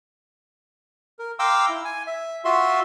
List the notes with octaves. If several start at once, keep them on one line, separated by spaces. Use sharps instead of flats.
A#4
F5 G5 A#5 C6 D6 E6
E4
G#5
E5
F4 F#4 E5 C6